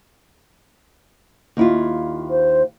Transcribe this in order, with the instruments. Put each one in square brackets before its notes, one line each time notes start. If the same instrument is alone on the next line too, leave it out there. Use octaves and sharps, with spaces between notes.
[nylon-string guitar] D#2 E4 F4
[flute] C5